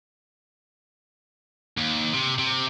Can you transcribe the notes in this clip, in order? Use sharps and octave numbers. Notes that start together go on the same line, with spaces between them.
D#2
C3
C3